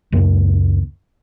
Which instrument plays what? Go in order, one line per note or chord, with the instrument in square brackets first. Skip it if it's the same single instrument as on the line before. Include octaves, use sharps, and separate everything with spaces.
[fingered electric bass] C#2 F#2 D#3 A#3